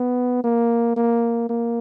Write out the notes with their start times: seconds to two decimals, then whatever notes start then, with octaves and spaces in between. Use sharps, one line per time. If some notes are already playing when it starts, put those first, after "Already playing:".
Already playing: B3
0.44 A#3
0.96 A#3
1.50 A#3